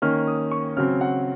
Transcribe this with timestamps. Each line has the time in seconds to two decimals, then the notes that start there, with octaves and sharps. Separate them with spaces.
0.02 D#3 A#3 C#4 F6
0.27 D#6
0.51 C#6
0.77 C#3 F#3 C4 F6
1.01 F#5